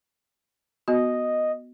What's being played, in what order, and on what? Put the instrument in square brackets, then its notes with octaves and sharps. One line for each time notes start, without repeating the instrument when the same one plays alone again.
[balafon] B3 F#4 [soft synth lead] D#5